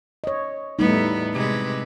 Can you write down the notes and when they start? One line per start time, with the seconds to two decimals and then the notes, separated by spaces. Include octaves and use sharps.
0.24 C#5 D#5
0.79 E2 A2 G3 A3 B3 D#4
1.33 C3 G#3 B4